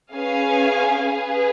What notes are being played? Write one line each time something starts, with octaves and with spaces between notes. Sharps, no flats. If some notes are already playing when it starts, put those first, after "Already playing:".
C#4 G#4 B4 F5 G#5
G#4 B4 F5 G#5